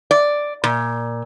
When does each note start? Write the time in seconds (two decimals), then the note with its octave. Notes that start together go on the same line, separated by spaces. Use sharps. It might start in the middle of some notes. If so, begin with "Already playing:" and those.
0.11 D5
0.64 A#2